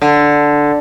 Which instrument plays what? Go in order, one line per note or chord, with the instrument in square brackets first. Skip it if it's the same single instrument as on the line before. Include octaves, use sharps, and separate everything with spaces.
[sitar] D3